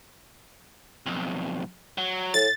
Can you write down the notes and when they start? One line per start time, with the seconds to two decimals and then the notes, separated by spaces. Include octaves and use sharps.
1.06 B1 F2
1.98 F#3
2.34 A2 A6